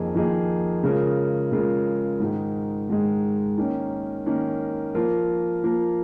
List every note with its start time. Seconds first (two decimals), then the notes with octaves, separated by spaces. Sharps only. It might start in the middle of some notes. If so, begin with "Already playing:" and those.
Already playing: F2 D#3 A#3 D#4 G#4
0.15 F2 D#3 A#3 D#4 G#4
0.83 C#3 G#3 F4 A#4
1.52 C#3 G#3 F4 A#4
2.20 G#2 D#3 G#3
2.90 G#2 D#3 G#3
3.58 D#3 A#3 C#4
4.26 D#3 A#3 C#4
4.95 F3 A#3 F4 A#4
5.64 F3 A#3 F4 A#4